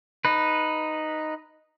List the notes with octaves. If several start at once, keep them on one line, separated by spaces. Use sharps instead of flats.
D#4 B4